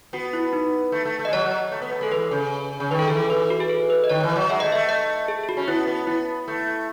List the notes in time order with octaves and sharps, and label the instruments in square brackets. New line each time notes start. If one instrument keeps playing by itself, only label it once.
[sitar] B3 [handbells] F#4
[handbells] E4
D#4
[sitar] A3
A3
A3
[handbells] D#5
[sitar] G#3
[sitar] F#3 [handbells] C#5
[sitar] F#3
A3
B3
A3
[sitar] G#3 [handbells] A4
[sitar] E3 [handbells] B4
[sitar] C#3
C#3
[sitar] D#3 [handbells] B4
[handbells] A4
[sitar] E3 [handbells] G#4
[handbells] A4
[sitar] E3 [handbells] B4
[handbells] F#4
G#4
A4
B4
D#5
[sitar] D#3 [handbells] C#5
[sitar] E3
F#3
[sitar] G#3 [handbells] E5
[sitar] A3 [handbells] D#5
[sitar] A3 [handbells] E5
[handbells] D#5
G#4
G#4
F#4
[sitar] C#4
[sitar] B3 [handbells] E4
[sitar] B3
[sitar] B3 [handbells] E4
[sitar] A3